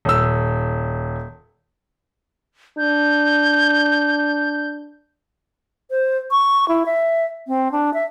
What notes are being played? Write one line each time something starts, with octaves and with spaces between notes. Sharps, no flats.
D#1 E6
D4 G6
C5
C#6
E4
E5
C4
D4
E5